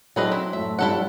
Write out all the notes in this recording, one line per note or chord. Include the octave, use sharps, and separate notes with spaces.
F#3 C4 D4 E4 G#4 A4 B4 D#5
C#4 E4
F#2 A2 A3 E5
G2 C3 F3 C#4 E4 A4 F#5